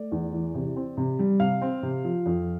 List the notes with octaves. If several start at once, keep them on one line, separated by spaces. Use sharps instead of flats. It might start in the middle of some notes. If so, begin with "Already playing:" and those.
Already playing: A3 D5
E2
E3
C3
C4
C3
G3
C3 F5
C4
C3
F3
F2